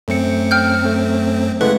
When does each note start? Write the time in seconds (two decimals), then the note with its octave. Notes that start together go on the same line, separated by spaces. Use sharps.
0.08 F#2 A3 C4 C#7
0.51 G5 F6 G6
0.85 A3
1.61 C#3 G#3 A3 E4 B4 F#5